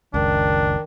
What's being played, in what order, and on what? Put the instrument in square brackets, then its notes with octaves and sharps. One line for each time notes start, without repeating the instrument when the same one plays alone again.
[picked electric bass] F#1 C#2 [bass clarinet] D#3 [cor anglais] D4